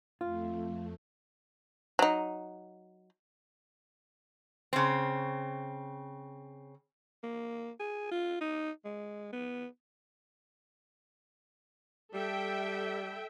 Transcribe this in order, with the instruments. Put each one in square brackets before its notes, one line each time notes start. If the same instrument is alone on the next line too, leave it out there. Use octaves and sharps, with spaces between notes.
[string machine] F2 A3 [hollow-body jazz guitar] F4
[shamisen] F#3 D#4
[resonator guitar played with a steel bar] C#3 C4
[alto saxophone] A#3
G#4
F4
D#4
G#3
B3
[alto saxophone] G3 [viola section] A4 E5 G5